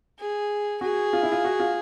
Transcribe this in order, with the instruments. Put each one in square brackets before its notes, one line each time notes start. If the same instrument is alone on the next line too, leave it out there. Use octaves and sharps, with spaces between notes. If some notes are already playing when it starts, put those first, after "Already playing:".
[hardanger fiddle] G#4
[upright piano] F#4 [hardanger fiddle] G#4
[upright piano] F4
E4
F4
F#4
F4